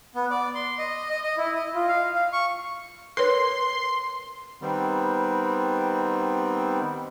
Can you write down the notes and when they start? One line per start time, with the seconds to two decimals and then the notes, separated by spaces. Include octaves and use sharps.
0.15 B3
0.31 D5
0.55 C6
0.79 D#5
1.09 D#5
1.23 D#5
1.37 E4
1.55 D#5
1.75 F4
1.89 F5
2.15 F5
2.33 C#6
3.17 A#4 B4 C#5 C6
4.62 D#3 G3 B3 C4